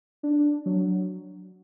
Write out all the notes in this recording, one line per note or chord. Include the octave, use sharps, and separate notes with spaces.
D4
F#3